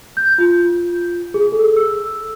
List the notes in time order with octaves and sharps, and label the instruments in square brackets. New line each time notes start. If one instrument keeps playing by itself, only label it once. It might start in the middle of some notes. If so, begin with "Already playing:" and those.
[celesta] G6
F4
G#4
A4
E6